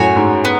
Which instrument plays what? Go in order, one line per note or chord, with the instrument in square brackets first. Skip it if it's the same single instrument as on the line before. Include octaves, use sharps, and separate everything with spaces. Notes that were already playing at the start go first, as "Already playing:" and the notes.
Already playing: [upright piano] F#2 A2 [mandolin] F#4 C#5 G#5
[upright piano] G#2
[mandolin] B3